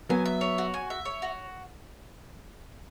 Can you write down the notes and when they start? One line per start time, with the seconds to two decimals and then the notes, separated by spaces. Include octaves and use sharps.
0.09 F#3 B3 G#5
0.25 E5
0.41 C#5
0.58 F#4
0.74 G#5
0.90 E5
1.05 C#5
1.22 F#4